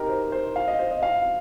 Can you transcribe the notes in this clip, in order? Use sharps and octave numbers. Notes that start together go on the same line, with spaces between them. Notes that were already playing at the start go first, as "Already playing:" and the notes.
Already playing: D#4 G4 A#4
C5
C5
F5
D#5
C5
D#5
F5